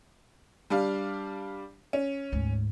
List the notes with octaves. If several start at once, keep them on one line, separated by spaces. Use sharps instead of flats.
G3 D4 F5
C#4
D2 G#2